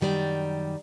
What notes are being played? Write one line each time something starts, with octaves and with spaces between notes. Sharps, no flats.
F#2 D#3 G3 A4 D5 A#5